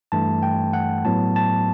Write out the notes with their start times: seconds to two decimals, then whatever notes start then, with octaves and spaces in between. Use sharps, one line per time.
0.12 G2 E3 A3 A5
0.43 G5
0.73 F#5
1.05 A2 F#3 B3 A5
1.36 A5